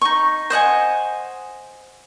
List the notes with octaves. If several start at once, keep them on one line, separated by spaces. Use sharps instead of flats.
D#4 C#6
C5 D#5 F#5 G#5